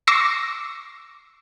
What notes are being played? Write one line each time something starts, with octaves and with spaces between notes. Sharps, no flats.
C#6 D6 E6 A#6 C7 C#7